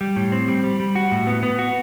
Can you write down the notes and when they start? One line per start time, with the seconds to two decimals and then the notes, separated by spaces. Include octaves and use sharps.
0.01 G3
0.16 A2
0.32 C4
0.48 G3
0.64 G3
0.80 G3
0.95 F#4
1.12 A2
1.27 B3
1.43 B3
1.59 F#4